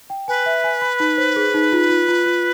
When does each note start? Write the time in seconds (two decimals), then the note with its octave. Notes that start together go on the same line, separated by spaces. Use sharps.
0.10 G5
0.28 B4 G#5
0.46 E5
0.64 G#5
0.82 B5
1.00 D#4
1.18 C5
1.36 G#4
1.54 D#4
1.72 F4
1.90 F4
2.08 F4
2.26 F4